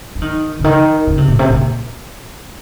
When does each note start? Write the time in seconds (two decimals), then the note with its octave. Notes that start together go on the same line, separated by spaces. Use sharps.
0.15 F3
0.22 D#3
0.59 C#3
0.64 D#3
1.07 C#3
1.18 C3
1.28 A#2
1.39 C3
1.50 A#2